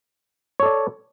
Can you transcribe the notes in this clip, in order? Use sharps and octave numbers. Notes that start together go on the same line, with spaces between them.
A4 C#5 D5